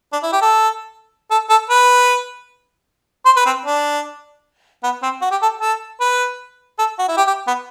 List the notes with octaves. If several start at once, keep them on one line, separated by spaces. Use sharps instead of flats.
D4
E4
G4
A4
A4
A4
B4
C5
B4
C4
D4
B3
C4
F#4
G4
A4
A4
B4
A4
F#4
E4
G4
G4
B3